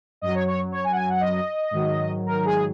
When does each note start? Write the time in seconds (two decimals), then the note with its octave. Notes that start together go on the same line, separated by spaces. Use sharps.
0.22 F#2 F#3 D#5
0.34 C#5
0.47 C#5
0.72 C#5
0.84 G#5
0.92 F#5
0.96 G#5
1.09 F#5
1.20 D#5
1.71 G#2 D#3 F#3
2.26 A#4
2.45 G#4